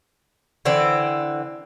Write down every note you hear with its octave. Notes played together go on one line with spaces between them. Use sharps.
D3 E3 C4 D5